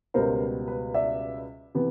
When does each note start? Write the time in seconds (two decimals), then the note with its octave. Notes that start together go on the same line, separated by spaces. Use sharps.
0.14 C#2 B2 G3 B3 A#4 C5
0.68 B4
0.94 D5 E5
1.75 C3 E3 B3